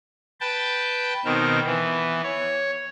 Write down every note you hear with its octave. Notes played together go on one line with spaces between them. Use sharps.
B4 G5 A5
B2 D#3 C4 A#4
E3 B3
C#5